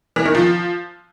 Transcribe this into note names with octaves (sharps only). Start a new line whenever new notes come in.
E3
D#3
F3